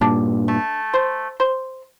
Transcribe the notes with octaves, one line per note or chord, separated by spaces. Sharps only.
G2 A#2 D4
A3
C5
C5